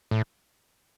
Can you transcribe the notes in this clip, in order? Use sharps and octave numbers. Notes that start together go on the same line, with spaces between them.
A2